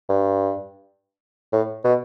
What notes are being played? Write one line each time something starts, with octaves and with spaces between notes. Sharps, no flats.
G2
A2
B2